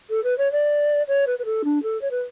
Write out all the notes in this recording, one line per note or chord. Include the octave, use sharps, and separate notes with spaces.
A4
B4
C#5
D5
C#5
B4
B4
A4
D4
A4
C#5
B4